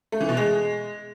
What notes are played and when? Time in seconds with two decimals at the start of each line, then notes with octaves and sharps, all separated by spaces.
0.12 A3
0.21 E3
0.29 B2
0.37 G#3